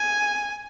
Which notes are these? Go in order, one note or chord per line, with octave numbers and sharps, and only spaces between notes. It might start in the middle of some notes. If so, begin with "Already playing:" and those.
Already playing: G#5